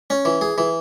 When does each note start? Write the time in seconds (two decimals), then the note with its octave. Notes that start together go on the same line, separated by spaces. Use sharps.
0.10 C#4
0.25 E3
0.41 G#4
0.58 E3